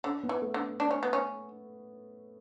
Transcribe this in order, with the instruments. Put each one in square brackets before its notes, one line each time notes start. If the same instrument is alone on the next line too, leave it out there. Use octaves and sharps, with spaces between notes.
[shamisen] D3 [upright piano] C#4
[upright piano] B3
[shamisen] E3
[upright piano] A3
[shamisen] D3
D4
C#4
B3
C#4